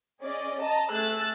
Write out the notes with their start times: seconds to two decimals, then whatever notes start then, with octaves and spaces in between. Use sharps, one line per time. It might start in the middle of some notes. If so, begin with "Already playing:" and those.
0.22 C#4 G#4 D5 D#5
0.60 D#5 A5 A#5
0.90 A3 G#4 E6 F#6 A6